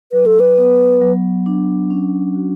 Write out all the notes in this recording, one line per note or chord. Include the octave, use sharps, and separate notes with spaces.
F#3 B4
A4
B4
B3
F#3
D4
C#4
F#4